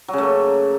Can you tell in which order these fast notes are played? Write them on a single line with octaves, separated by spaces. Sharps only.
F#3 C#3 A3 A#3